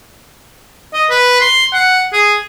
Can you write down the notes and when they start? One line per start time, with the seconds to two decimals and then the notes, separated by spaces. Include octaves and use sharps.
0.94 D#5
1.10 B4
1.41 C6
1.73 F#5
2.13 G#4